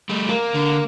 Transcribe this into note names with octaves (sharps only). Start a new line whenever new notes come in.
G3 A3
A#3
D3